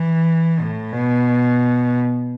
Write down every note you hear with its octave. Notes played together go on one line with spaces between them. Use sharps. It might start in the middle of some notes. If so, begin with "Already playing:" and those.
Already playing: E3
A2
B2